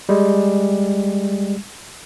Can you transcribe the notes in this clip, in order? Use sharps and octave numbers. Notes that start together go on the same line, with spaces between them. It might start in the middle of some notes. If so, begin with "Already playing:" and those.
G3 G#3